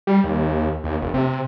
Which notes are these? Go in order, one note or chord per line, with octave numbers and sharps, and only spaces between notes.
G3
D#2
D#2
F1
C3